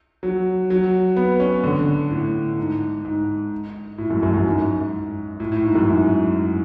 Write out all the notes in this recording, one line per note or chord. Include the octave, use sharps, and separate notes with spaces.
F#3
F#3
B3
C#4
D3
A2
G#2
G#2
A2
F#2
F#2
F#2
G#2
A2
A2
G#2
F#2
G#2